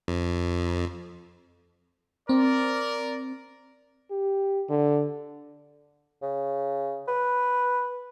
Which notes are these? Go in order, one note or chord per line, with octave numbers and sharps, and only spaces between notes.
F2
C4 A#4 D5
G4
D3
C#3
B4